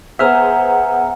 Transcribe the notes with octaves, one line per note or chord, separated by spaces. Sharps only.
B3 G#4 C5 E5 F#5 G#5 A#5 F6